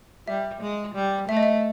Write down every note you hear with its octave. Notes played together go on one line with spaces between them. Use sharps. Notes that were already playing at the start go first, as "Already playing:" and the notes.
G3 E5
G#3
G3
A3 E5
D#5
E5